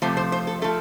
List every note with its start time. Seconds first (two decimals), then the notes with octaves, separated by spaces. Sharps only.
0.02 C3 F3 A3 C5
0.17 C5
0.32 C5
0.47 A4
0.62 F3 A3 A4